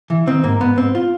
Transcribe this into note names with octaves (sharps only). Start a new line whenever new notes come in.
E3
D#3 C4
G#2 A#3
G#2 B3
G#2 C4
F4